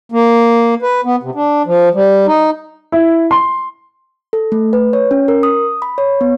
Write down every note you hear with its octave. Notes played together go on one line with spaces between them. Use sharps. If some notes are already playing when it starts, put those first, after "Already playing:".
A#3
B4
B3
C3
D4
F3
G3
D#4
E4
C6
A4
A3
B4
C#5
C#4
A#4
D#6
B5
C#5
B3